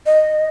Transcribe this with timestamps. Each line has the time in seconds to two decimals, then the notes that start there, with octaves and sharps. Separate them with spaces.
0.06 D#5